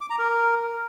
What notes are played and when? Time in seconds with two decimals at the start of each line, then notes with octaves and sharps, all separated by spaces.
0.01 D6
0.10 A#5
0.19 A#4